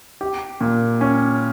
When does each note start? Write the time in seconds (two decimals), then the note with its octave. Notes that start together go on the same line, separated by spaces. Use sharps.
0.21 G4
0.61 A#2
1.01 C#4